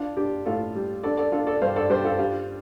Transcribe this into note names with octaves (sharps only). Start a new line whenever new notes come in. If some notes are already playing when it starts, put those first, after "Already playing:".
Already playing: D4 F4
D4 G4
A2 F4 A4
G3
D4 A4 D5
A4 D5
D4 F4 A4
A4 D5
G2 C5 F5
A4 D5
G2 G4 C5
F4 A4
G3 F4